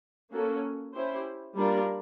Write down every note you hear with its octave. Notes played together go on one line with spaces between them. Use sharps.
A#3 C#4 F#4 A4
C#4 E4 G4 C5
G3 A#3 D4 F4 A#4